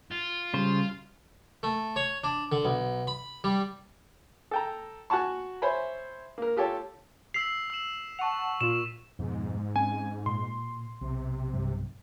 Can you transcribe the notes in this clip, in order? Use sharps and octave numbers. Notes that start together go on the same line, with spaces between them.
F4
C#3 G3 C5
A3
C#5
D4
D3
B1
B5
G3
A4 G5 A#5
F#4 F#5 G#5 A5 C#6
C5 C#5 E5 G#5 B5
A#3 A#4
F4 G4 A4 C#5 G5
E6 B6 C7 F7
E6 E7
F#5 A5 C#6 F7
A#2 F4 E7
F2 G#2 B2
C4 C#4 G#5
A#2 C6
B1 C3
B1 G2 F#3